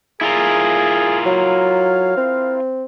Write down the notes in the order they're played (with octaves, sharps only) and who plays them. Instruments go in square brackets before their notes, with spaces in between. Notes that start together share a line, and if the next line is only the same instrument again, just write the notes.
[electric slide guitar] E4 F4 A#4 [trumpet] G#4
[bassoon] F#3 [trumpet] F5
[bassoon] C4